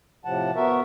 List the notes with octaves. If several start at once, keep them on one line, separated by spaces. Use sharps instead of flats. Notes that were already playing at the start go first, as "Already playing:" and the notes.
A2 C3 F3 F#5 A5
B3 F#4 A#4 E5